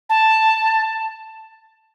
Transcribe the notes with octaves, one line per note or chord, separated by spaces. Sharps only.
A5